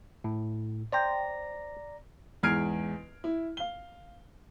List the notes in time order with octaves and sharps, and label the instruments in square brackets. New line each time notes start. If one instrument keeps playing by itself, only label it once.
[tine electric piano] A2
[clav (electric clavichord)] C5 G5 [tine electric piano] D5 A#5 A#6
[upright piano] E2 G#2 F6 G#6 C7 D7
E4
F5 G7